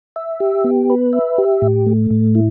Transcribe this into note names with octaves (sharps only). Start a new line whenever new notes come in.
E5
G4
B3
B4
E5
G4
A2
A3
A2
E4